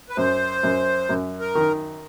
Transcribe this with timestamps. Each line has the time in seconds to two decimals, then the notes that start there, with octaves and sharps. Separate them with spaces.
0.10 B4
0.17 F#2 C5
0.63 F#2
1.09 F#2
1.40 A#4
1.55 D#3